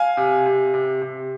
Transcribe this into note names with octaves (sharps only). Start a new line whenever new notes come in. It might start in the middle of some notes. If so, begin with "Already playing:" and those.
Already playing: F5 G#5
C3
C3
C3
C3